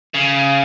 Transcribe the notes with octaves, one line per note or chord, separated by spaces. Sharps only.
C#3